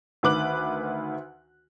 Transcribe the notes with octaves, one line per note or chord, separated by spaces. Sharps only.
D2 D#3 B4 D6 F#6 F#7